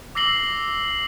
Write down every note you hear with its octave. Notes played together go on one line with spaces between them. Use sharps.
D6 E6 A#6 C7 F#7 G7